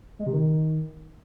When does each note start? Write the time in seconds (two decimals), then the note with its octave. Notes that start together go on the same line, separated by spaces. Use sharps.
0.19 G#3
0.26 C3
0.33 D#3